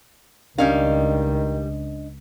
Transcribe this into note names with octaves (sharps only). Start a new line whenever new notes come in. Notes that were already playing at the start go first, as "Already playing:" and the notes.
C#2 D#3 G3 C#4 D4 D#5 F5